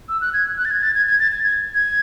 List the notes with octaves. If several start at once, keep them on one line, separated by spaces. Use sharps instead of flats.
E6
F#6
G#6
F#6
A6
G#6
A6
G#6
G#6
A6
G#6
G#6
G#6